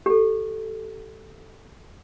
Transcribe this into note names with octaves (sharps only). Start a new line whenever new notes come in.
G4 A4